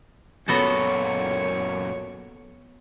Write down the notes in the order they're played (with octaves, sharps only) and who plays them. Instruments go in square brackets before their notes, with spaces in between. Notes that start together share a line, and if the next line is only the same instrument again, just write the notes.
[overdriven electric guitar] F#2 A#2 [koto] B3 F#4 A4 [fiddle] C#5